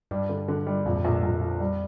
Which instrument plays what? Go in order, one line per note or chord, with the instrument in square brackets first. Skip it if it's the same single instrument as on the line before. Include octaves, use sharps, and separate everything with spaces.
[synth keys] G2 [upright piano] G3
[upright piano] D3
D3
G3
[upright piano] A#1 [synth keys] F2
[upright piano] A#1
A#1
F3
G3